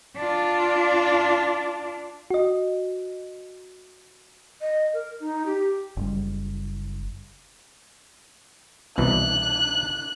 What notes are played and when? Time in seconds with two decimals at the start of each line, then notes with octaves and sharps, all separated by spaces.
0.16 D4 F4
2.31 F#4 D#5
4.61 D#5
4.94 A#4
5.20 D#4
5.46 G4
5.97 F#1 G3
8.98 C2 B2 E3 F#6